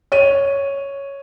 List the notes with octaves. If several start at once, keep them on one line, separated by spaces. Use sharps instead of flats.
C#5 D#7